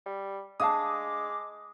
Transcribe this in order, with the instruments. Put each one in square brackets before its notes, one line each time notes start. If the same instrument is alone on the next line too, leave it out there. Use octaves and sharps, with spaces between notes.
[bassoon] G3
[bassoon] G#3 [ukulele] D4 F5 A5 [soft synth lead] D6 [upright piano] D#6